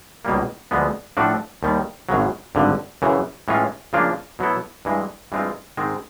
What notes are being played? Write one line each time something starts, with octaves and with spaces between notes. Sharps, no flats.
C#2 B2 G3 A#3
D2 D3 F3 G#3 B3
A2 F3 A3 D4 F#4
D#2 D#3 G3
G#1 F#2 C#3 F#3
G#1 G2 D3
F#2 C#3 E3
A2 E3 G#3 C#4 F4
C#3 F3 A#3 D4 F4
B2 F#3 B3 E4 A4
G2 E3 G#3
G2 E3 G#3 C4 F4
G#2 D#3 G#3 C4